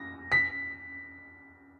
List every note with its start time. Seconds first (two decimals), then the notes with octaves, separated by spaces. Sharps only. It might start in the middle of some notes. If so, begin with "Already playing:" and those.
Already playing: A#6
0.32 B6